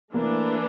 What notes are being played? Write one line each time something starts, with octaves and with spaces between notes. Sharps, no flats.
E3 A3 A#3 D4